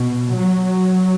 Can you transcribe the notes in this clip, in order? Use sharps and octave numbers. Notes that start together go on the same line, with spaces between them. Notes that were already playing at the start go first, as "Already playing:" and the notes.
Already playing: B2
F#3